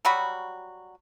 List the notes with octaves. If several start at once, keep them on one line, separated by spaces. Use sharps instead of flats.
F#3 G3 F#4 B5